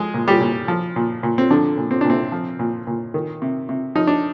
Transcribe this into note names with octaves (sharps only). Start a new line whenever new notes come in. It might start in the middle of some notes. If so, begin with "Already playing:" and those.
Already playing: F3 G#3 G#4
A#2
G3 G4
A#2
F3
A#2
A#2
C4
D3 F3 D4
A#2
C4
A#2 D4
C3 C4
F3
A#2
A#2
D#3
C3
C3
F3 D#4
D4